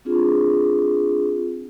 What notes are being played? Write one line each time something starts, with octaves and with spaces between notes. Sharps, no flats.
C4 D4 F4 G#4